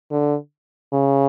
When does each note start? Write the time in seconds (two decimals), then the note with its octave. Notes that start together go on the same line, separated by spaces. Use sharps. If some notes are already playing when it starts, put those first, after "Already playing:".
0.11 D3
0.93 C#3